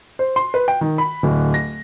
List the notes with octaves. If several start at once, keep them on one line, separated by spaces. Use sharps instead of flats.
C5
C6
B4
G5
D#3
B5
D1
A#6